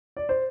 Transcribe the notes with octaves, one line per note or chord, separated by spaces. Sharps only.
D5
C5